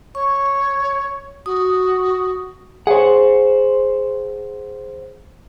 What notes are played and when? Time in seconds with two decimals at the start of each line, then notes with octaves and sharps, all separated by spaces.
0.15 C#5 C#6
1.46 F#4 D#6
2.87 G#4 C5 C#5 F#5